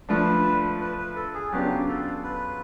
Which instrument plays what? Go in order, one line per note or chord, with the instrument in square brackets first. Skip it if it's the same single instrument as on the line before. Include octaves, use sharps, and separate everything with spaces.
[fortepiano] F3 A3 D4 [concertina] B4
[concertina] B4
B4
A4
G#4
[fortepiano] C#3 F#3 B3 D4 F4 [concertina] G4
[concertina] A4
B4